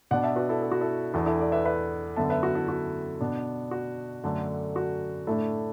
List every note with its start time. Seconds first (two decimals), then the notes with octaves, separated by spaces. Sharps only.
0.11 B2 B3 D4 D5 F#5
0.24 E5 A5
0.36 F#4 B4
0.49 E4 A4
0.62 A4
0.72 F#4
0.81 E4 A4
1.13 E2 E3 D4 E4 A4
1.26 E4 A4
1.40 A4 D5
1.52 B4 E5
1.66 B4 E5
2.16 F#2 D3 B3 E5 A5
2.30 B4 E5
2.43 F#4
2.55 E4 A4
2.69 F#4
3.21 B2 B3 D4
3.71 F#4
4.24 F#2 D3 A3 D4
4.76 F#4
5.27 A2 A3 D4 E4 A4